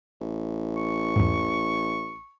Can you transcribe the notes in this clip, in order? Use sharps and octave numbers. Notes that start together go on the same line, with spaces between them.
A1
C#6
E2 G#2